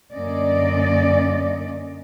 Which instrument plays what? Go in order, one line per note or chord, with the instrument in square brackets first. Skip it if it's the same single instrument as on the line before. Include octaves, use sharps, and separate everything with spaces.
[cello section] F#2 D3 A#3 C#4 D5 D#5